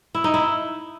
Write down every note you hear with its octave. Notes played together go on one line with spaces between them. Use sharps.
E4
D#4
E4